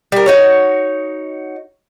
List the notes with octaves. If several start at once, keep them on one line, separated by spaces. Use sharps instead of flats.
G3 A#4
D#4 F#4 C#5